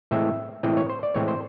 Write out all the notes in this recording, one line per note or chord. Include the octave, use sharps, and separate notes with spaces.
A2 E3 G#3 C4 E5
A2 E3 G#3 C4 D#5
C#5
C5
D5
A2 E3 G#3 C4 C#5
C5